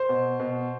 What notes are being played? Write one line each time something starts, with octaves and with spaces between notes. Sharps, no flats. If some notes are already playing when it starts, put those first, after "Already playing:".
Already playing: C5
B2
B2